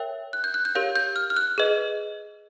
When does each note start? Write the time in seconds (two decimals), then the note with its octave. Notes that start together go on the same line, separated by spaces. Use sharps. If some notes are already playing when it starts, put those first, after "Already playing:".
Already playing: A#4 C#5 E5 G5
0.33 F#6
0.44 G6
0.54 F#6
0.65 G6
0.75 G4 A#4 C#5 F5 G6
0.96 G6
1.16 F6
1.30 F6
1.36 F#6
1.58 G#4 B4 D#5